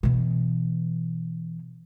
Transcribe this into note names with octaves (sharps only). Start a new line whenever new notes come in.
B2 E3